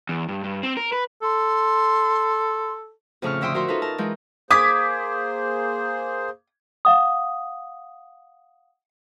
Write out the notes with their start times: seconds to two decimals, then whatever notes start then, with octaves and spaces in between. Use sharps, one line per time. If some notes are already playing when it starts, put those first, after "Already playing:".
0.09 E2
0.29 G2
0.44 G2
0.63 C4
0.77 A#4
0.93 B4
1.23 A4 C6
3.22 F2 A2 C#3 A5 C#6 F6
3.41 D3 F3 E5 G5 C6 D#6
3.54 F#4 A#4 C5 E5 C6 C#6
3.68 D#4 F4 A4 B4
3.82 A#4 A5
3.98 E3 G#3 F4 G6
4.51 A#3 G#4 C5 D6 D#6 G#6 B6
6.85 F5 F#5 D#6